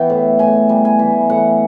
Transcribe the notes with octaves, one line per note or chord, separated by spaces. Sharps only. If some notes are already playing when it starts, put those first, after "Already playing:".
Already playing: E3 B3 G5
A2
A2 G#5
G3
G#5
E3
A2 F#5